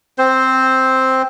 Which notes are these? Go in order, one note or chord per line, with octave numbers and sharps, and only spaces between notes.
C4 C5